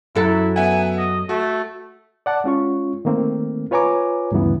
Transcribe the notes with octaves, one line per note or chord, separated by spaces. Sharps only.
F#2 F#3 E4 A4
B3 E5 F#5 G#5
D#5
A3 F#4
D5 F#5 A5 D6
G#3 C#4 F4 C#6
D#3 A3 A#3 C4
F4 B4 C#5 G#5 A#5 D6
D2 G2 C#3 E3 B3